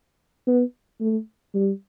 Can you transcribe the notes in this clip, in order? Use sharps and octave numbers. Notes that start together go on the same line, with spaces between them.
B3
A3
G3